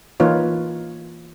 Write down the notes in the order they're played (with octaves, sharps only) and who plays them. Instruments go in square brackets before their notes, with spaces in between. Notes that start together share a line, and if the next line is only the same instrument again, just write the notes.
[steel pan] E3 A#3 D#4 F4 B4 C#5